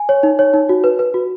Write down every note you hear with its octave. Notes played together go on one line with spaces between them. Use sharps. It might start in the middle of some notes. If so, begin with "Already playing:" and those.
Already playing: G#5
C#5
D#4
C#5
D#4
F#4
B4
B4
F#4